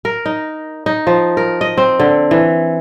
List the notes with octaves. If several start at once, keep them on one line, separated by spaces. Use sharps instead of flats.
A#4
D#4
D#4
F3
A#4
D#5
C4
D3
E3